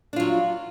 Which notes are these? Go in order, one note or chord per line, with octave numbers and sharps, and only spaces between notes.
F#3 D4 F4